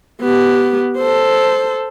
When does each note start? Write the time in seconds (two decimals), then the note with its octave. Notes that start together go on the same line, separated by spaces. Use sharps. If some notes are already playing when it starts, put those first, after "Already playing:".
0.21 B3 G4
0.97 A4 C5